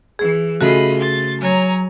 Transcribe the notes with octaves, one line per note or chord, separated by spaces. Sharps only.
E3 G#4
C#3 A3 F4 F#4 A4 D#5 B5
C6 A6
F#3 C#5 G#5 A#5